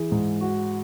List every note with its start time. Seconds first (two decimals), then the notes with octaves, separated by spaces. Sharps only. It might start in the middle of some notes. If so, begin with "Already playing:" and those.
Already playing: E3 G#4
0.11 G#2
0.41 F#4